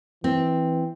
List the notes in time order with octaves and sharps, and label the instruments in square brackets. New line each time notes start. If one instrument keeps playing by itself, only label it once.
[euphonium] E3 [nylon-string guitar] C4